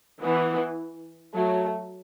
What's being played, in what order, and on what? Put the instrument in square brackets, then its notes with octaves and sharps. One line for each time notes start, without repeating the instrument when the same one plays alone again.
[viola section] E3 [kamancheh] B3
[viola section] F#3 [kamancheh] A3